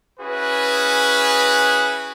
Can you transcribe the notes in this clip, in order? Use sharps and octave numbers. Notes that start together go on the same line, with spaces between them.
C#4 E4 F#4 G#4 B4